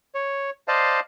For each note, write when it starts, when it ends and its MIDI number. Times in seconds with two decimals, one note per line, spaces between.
0.15 0.50 73
0.68 1.00 72
0.68 1.00 74
0.68 1.00 75
0.68 1.00 77
0.68 1.00 81